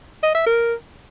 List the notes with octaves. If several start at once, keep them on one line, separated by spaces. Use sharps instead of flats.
D#5
E5
A#4